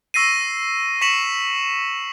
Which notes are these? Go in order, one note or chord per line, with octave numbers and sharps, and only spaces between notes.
C#6 E6 A#6 C7 D#7
C#6 B6 C#7 E7 F#7